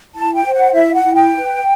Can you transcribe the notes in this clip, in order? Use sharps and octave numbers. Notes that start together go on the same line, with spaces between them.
E4 A5
G5
C5
F#5
E4 E5
F#5
E4
G5
B4